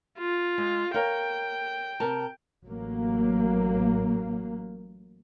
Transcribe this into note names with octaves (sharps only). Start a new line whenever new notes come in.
F4
G#3
A#4 C#5 F5 G5
C3 A#4 A5
A1 F#3 A#3